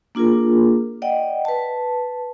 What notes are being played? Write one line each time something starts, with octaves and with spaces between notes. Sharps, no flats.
A#3 D4 F4 G#4 A#4
D5 D#5 F#5 G5
B4 A5